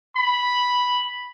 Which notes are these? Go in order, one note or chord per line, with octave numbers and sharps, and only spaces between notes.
B5